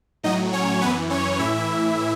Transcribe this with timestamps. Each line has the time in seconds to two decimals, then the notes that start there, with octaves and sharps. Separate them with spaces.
0.23 A2 F#3 D#4 D#5
0.53 C#4 C#5
0.81 F#2 E3 B3 B4
1.10 C#4 C#5
1.39 A2 E3 E4 E5